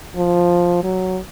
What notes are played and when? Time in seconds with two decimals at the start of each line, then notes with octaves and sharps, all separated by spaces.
0.17 F3
0.84 F#3